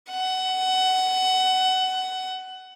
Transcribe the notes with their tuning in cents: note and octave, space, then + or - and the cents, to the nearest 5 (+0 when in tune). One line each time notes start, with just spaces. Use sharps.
F#5 +20